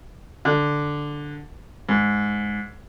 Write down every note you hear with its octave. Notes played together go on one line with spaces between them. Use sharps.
D3
G#2